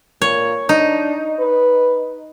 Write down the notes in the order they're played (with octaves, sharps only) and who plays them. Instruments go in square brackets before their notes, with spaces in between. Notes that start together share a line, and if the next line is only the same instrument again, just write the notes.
[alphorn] A#2 [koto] C#5
[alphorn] D4 [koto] D#4
[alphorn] B4